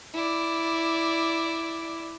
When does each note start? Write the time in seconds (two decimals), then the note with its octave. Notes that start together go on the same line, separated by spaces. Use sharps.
0.14 E4 D5